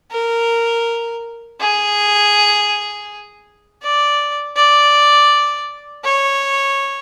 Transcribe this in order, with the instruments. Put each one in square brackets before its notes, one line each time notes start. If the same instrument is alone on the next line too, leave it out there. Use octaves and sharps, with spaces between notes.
[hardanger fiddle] A#4
G#4
D5
D5
C#5